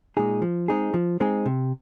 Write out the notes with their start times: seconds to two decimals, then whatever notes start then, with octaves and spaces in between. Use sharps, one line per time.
0.17 A#2 G#3 D#4 G#4
0.42 F3
0.68 G#3 C4 D#4 G#4
0.94 F3
1.20 G#3 C4 D#4 G#4
1.46 C3